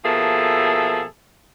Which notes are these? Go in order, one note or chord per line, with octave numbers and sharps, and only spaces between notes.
B2 F3 A#3 G#4 A4 E5